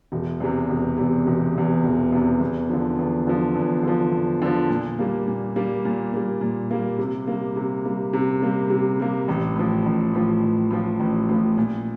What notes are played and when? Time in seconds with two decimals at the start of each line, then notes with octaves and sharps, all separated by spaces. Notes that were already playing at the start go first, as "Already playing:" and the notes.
0.12 E1
0.40 E2 C3
0.69 E1
0.97 E2 C3
1.27 E1
1.55 E2 C3
1.84 E1
2.12 E2 C3
2.40 E2
2.69 D3 F3
2.99 E2
3.27 D3 F3
3.55 E2
3.83 D3 F3
4.12 E2
4.42 D3 F3
4.69 A#2
4.99 G3 A#3
5.28 A#2
5.56 G3 A#3
5.85 A#2
6.13 G3 A#3
6.41 A#2
6.71 G3 A#3
6.99 C3
7.27 G3 A#3
7.56 C3
7.85 G3 A#3
8.13 C3
8.42 G3 A#3
8.70 C3
9.00 G3 A#3
9.28 A1
9.56 A2 F3
9.86 A1
10.14 A2 F3
10.43 A1
10.71 A2 F3
11.00 A1
11.29 A2 F3
11.58 A#2